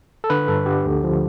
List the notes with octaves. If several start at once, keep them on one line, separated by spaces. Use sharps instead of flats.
A4
D3 B4
G2 A4
D3 G4
D2
F3